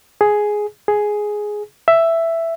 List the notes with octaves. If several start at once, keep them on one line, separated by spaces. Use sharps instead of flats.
G#4
G#4
E5